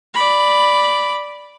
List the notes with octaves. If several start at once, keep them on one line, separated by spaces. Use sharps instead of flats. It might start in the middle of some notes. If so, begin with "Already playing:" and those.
D5 B5